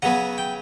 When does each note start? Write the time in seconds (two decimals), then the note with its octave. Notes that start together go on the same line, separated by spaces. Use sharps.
0.02 C#3 F#3 B3 F#5
0.38 G5